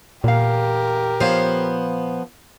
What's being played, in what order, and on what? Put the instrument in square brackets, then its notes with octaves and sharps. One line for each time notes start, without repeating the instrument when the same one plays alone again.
[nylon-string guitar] E2 F5 [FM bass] A#2 [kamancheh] G4 A#4
[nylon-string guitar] F3 C#5 F5 [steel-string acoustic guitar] B3 C5